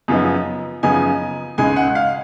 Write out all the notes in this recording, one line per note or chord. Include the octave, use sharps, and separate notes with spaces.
F#2 C#3 F3 B3 D#4
F#2 C#3 F3 B3 D#4 G#5
C#2 C#3 G#3 D#4 G#5
F#5
F5